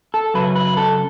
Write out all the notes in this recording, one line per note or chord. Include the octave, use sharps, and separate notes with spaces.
A4
F#2 C#3 F#3 B4
B4
A4